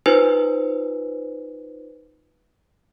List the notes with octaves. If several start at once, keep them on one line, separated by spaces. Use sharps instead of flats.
D#4 F4 B4 C5 G#5 E6